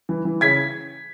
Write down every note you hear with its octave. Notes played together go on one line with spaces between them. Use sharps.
E3
E3
C#3 G#6 B6